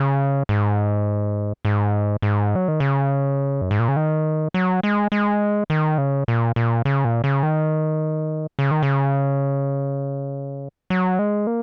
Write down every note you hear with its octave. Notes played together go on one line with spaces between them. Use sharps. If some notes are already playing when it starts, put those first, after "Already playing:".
Already playing: C#3
G#2
G#2
G#2
F#3
D#3
C#3
F#2
G#2
A#2
C#3
D#3
F#3
G#3
G#3
D#3
C#3
A#2
A#2
C#3
A#2
C#3
D#3
C#3
D#3
C#3
F#3
G#3
A#3